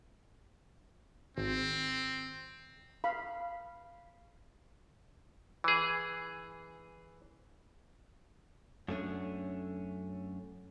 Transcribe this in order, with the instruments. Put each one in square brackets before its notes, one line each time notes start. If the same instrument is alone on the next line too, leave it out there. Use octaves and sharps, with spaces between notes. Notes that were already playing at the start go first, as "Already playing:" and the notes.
[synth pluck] G#1 [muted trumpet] C4
[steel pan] F5 B5
[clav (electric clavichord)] E3 G#4
[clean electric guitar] F#2 A3 C#4 D4